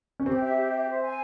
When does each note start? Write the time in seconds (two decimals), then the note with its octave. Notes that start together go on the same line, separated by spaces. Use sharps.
0.20 C#4
0.26 C4 G4
0.41 E5
0.56 G4
0.71 E5
0.87 C5
1.02 G#5